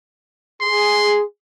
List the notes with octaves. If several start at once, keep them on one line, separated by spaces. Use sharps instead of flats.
G#4 C6